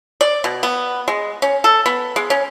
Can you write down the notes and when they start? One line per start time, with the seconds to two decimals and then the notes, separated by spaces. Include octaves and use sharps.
0.21 D5
0.44 B2
0.63 B3
1.08 G#3
1.42 C#4
1.64 A4
1.86 B3
2.16 G#3
2.30 C#4